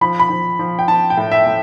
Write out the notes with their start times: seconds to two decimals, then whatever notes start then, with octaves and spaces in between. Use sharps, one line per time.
0.01 F3 B5
0.19 B5
0.30 F3
0.59 F3
0.79 G5
0.88 F3 A5
1.10 G5
1.17 A2
1.32 E5
1.46 A2